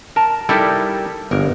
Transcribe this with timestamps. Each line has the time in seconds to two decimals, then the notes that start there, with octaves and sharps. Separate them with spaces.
0.16 A#4 A5
0.49 G3 D#4 E4 G4 A4 A#4
1.31 G1 A#4